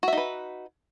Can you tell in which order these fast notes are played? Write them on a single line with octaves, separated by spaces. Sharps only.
F#4 E5 D#4 B4